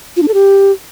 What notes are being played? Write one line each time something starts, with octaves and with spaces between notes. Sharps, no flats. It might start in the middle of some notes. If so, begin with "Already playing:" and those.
F4
D4
A4
G4